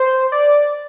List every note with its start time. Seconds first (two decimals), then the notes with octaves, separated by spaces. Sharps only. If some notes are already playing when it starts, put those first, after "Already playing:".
Already playing: C5
0.32 D5